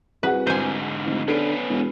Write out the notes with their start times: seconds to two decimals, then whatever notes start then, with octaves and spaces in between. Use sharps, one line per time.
0.23 C2 F#4 G#4 B4 F#5
0.47 G#2 D3 C5 G#5
1.06 F1 D#3
1.28 D3 B3 C#4 A4 C7 D7
1.69 E1